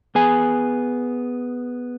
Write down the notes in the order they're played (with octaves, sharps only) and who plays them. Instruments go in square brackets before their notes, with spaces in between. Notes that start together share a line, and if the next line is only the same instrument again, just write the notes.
[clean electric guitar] B3 G#4 G#5